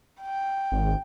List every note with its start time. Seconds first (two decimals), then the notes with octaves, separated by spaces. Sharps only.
0.22 G5
0.72 G#1